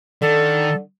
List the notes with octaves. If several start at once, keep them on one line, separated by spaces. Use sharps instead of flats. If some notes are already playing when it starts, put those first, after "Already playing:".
D3 D#3 A4